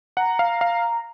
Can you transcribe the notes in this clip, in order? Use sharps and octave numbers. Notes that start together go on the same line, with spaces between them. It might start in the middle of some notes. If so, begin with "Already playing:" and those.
F#5 A#5
F5
F5